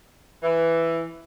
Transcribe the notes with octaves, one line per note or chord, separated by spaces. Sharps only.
E3